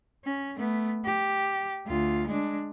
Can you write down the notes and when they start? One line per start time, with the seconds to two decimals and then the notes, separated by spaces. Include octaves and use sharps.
0.25 C#4
0.56 A3 B3
1.05 G4
1.86 D2 F4
2.27 G#3 D4